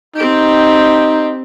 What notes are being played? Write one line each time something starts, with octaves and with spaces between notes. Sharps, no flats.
C4 D#4 G4